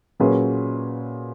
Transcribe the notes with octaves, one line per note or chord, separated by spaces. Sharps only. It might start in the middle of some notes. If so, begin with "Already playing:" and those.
A#2 F#3 C#4 G#4 B4